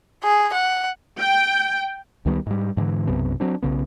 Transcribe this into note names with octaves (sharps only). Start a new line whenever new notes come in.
G#4
F#5
G5
C#2 D#3 G3 B3
G#2 G3
G#2 D3 E3
B1 F#2 C3 B3
F#3 C4 D4
B1 C#3 B3